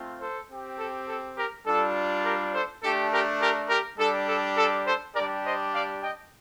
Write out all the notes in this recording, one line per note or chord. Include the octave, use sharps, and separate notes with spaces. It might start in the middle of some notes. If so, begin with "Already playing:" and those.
Already playing: A3 C4 F4
A4 C5
C4 G4
A4
A4
G4 A#4
G3 D4 F4 A4
G4 A#4
A4 C5
A3 D4 G4 A4
G4 A#4
G4 A#4
G4 A#4
G3 D4 G4 A4
A4
A4
A4 C5
G3 D4 G4 A#4 D5
C5 D#5
D5 F5
D#5 G5